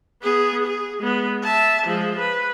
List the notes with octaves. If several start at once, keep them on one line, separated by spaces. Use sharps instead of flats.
B3 G#4
G#4
G#3 B3
E5 A5
F3 G#3
B4